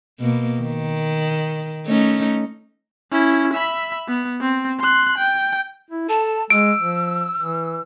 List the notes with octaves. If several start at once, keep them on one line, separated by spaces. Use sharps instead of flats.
B2 A#3
D#3
A3 C#4 D#4
C#4 E4
E5 B5
B3
C4
C6 F#6
G5
E4
A4 A5
G#3 E6 D7
F3
E3